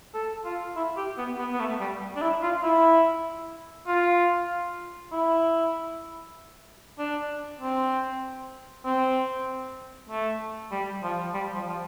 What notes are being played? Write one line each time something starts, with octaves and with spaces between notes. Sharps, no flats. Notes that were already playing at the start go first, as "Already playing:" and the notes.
A4
F4
E4
G4
B3
B3
B3
A3
G3
D4
E4
F4
E4
F4
E4
D4
C4
C4
A3
G3
F3
G3
F3
F3